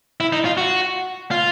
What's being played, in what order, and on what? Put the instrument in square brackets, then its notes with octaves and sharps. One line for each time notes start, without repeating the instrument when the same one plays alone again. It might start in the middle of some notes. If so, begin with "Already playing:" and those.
[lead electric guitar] E4
D#4
F4
F#4
F4